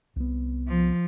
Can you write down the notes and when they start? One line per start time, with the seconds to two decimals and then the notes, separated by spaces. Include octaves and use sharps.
0.16 C2 B3
0.68 F3